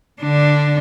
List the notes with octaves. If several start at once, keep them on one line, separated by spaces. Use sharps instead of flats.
D3 D4